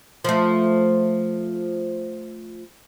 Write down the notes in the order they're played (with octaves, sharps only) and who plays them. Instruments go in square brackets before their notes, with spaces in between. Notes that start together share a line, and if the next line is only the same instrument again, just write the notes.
[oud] F3 A3